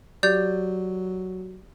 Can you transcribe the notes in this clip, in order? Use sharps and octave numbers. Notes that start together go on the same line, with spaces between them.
F#3 G4 D5 G6